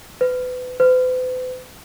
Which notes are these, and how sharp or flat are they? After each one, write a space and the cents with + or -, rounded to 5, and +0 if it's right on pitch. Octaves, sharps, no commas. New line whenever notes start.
B4 +30
B4 +45